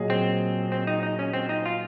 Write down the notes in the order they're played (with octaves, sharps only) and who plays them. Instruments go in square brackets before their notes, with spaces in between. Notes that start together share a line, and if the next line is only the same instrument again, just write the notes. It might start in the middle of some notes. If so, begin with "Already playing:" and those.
Already playing: [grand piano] A#2 F#3 G#4 D#5
[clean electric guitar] C4
C4
D#4
D#4
C#4
C4
D#4
F4